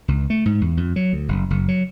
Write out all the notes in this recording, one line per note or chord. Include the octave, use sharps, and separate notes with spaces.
C#2
A3
G#2
E2
F2
F#3
D2
F#1
F#1
F#3